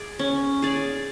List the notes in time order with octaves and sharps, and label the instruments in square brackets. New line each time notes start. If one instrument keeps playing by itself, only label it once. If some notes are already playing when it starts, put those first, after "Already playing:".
Already playing: [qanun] G#4 D5
C#4
G#4 D5